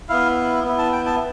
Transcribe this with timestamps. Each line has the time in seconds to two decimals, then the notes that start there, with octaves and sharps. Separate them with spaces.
0.09 B3 E4 F5
0.64 B3 E4
0.78 A5
0.92 G5
1.06 A5